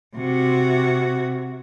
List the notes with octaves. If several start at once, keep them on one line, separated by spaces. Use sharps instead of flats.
C3 F#4